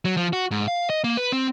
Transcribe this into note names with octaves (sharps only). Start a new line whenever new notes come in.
F#3
F3
F#4
G#2
F5
D#5
A#3
B4
C4